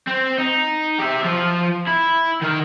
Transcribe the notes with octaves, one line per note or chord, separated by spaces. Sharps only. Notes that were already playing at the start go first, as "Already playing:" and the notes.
C4
D#4
G4 E5
F3 F4
E4
D#3 A#4